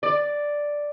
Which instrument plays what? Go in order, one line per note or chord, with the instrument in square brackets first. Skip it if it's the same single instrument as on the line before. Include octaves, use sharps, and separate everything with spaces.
[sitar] D5